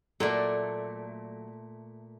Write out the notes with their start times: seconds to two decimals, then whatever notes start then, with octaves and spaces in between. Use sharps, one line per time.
0.20 A#2 F#3 A3 A#3 A4 D5